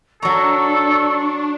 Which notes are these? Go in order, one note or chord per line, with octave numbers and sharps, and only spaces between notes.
F#3 D4 A4 A#5 C#6